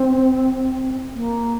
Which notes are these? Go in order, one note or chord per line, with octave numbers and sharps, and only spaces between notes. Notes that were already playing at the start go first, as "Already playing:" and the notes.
Already playing: C4
A#3